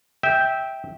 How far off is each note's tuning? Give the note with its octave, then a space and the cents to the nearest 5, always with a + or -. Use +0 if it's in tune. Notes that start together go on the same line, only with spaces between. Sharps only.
E5 -15 G5 +0